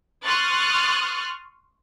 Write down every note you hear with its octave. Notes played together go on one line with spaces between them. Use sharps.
C6 C#6 D#6 F6 F#6 A6